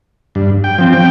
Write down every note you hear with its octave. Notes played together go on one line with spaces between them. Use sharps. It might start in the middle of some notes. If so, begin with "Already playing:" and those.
G2
G5
F3 C4
G5